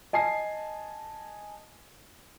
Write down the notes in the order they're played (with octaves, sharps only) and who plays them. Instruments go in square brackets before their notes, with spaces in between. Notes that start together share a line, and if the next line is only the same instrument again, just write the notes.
[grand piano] D#5 G#5 A5 C7